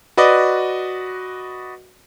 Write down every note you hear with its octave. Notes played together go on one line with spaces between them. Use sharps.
F#4 B4 D5 D#5